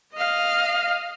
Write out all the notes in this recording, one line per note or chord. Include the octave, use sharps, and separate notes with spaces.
D#5 F5